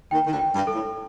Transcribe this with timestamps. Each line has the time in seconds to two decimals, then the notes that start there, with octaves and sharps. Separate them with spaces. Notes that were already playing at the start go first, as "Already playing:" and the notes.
0.11 D#2 D#3 G5
0.26 D#3
0.32 D2 D3
0.39 G5
0.54 G2
0.67 A4
0.74 A2